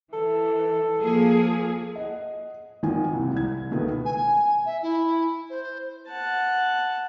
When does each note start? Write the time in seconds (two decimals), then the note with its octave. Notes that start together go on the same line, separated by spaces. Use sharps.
0.13 E3 A4
0.99 F3 A#3 G#4
1.96 D#5 F#5
2.83 G#1 D#3 F3 G#5
3.13 C2 C3
3.33 C2 G#6
3.71 C#2 B2 D#3 A3 B3
4.05 G#5
4.65 E5
4.82 E4
5.50 C5
6.09 F#5 A5